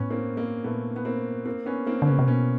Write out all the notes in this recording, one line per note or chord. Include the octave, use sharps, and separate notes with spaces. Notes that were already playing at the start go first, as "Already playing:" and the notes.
Already playing: A2 B3 C#4
A#3 C4
A#3 C4
A#2 A3 B3
B3
A#3 C4
A#3 C4
B3 C#4
A#3 C4
D3
C#3 B3 C#4
C3
B2 B3 C#4